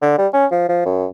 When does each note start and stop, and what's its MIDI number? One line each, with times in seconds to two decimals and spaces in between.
0.02 0.15 50
0.18 0.27 55
0.34 0.46 61
0.51 0.68 53
0.69 0.83 53
0.85 1.06 42